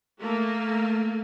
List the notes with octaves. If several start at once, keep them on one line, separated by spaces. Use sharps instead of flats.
A3 A#3